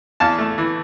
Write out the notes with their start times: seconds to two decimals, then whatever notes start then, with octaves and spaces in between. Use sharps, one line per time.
0.20 E2 F5 A5
0.39 A3
0.58 E3